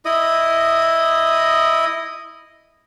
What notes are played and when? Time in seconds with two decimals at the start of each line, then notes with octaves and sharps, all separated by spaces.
0.05 E4 D#5 D#6